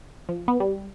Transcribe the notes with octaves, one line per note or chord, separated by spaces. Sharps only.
F3
B3
G3